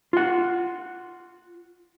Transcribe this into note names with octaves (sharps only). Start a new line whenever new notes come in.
F4 F#5